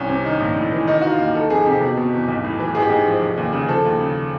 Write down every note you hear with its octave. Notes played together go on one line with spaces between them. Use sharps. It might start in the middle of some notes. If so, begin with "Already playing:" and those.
Already playing: C2 C#4
C3
D#3
A#1
A2
E3
D#3 D#4
D#3 F#4
F4
D#2
D#3 A4
F2 G#4
C3 G4
B2
B2
E2
B1
A2
E3
A1 G#4
G4
G#2 G#4
F3
F1
D#2
C#3
F3 A4
D#2
C#3